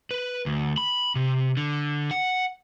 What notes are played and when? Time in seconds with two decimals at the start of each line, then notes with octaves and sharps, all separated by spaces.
0.11 B4
0.46 D2
0.78 B5
1.15 C3
1.57 D3
2.11 F#5